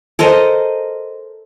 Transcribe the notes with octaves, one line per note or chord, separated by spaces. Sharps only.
A4 A#4 C5 D#5